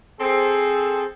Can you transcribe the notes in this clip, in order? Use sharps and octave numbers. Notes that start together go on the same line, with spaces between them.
C4 G#4 A4